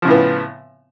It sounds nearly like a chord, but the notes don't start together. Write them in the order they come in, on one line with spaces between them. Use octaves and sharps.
F3 C#3 A2 B3